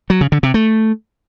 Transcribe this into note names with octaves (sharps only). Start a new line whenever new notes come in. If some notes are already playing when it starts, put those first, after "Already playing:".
F#3
C#3
D3
C3
A3